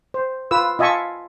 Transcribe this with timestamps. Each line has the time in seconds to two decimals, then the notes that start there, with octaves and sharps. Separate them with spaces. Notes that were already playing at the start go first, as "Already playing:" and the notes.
0.14 C5
0.51 F4 B4 E6
0.79 F4 D#5 E5 G#5 A5 C#6